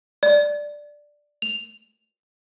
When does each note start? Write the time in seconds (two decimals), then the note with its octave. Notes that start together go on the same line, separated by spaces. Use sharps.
0.23 D5
1.42 F7